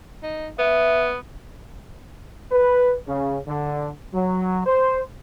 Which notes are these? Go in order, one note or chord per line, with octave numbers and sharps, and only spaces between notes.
D#4
B3 E5
B4
C#3
D3
F#3
C5